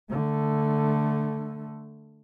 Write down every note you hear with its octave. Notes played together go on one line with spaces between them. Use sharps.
D3 A3